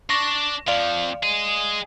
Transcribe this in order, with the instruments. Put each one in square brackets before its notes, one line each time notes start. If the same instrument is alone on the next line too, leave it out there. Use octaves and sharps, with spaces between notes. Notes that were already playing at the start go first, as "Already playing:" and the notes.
[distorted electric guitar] D4 D5 [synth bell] C#6 A#6
[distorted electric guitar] F2 F3 [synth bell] D5 F5
[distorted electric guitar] G#4 D#5